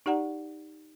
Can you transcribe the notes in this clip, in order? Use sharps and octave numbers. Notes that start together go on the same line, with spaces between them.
D#4 G4 D5 F#5 A#5